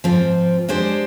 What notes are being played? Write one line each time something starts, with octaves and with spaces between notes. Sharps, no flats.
G#2 F3 C4
G#3 D4 G4 C5